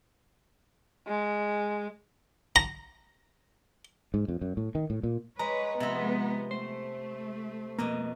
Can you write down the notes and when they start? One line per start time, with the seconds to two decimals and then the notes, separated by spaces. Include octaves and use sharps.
1.07 G#3
2.56 A#5
4.14 G#2
4.28 F2
4.41 F#2
4.57 A2
4.75 D#3
4.90 A2
5.03 A#2
5.39 G#3 B4 C#5 A#5
5.80 C3 F3 G#3 B3 C4
6.51 A3 C5
7.79 F2 B2 A#3 D#5